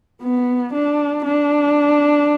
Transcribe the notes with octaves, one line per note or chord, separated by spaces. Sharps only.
B3
D4
D4